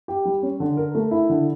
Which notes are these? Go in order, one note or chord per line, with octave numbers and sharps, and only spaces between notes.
G4
G3
C#4
D3
A#4
A3
E4
D3